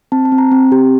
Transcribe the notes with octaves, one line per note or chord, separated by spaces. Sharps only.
C4 A5
A5
C4
A#5
C4
G4